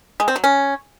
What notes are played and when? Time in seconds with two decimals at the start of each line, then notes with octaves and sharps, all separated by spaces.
0.20 G#3
0.28 C4
0.36 F#3
0.44 C#4